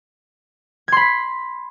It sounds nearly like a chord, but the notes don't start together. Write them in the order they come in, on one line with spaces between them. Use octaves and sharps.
G#6 C6 B5 B6